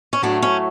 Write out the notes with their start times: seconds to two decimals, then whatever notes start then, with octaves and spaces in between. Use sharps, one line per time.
0.13 C#4
0.22 A2 F#3 A3 D4
0.42 C#4